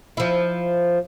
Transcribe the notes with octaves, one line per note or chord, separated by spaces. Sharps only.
F3 E4